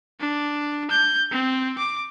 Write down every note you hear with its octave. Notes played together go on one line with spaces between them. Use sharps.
D4
G6
C4
D6